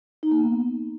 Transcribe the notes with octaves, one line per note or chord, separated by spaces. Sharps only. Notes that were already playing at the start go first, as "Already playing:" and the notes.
D#4
A#3
B3